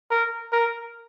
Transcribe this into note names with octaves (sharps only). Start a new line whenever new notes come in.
A#4
A#4